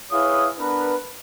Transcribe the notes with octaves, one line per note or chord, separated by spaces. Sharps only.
E4 G#4 B4 C#5 F5 D#6
B3 D4 A#4 B4